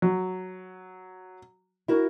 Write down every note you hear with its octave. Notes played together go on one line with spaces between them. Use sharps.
F#3
E4 F#4 A#4